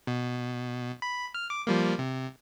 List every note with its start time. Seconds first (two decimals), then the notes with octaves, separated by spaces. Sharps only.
0.07 B2
1.02 B5
1.35 F6
1.50 D6
1.67 F3 G3 A#3
1.99 C3